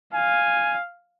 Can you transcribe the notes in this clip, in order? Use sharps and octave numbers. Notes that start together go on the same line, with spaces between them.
F5 G#5